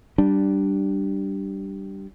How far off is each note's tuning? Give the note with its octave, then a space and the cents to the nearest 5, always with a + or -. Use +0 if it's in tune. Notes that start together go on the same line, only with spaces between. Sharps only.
G3 -10 D4 +0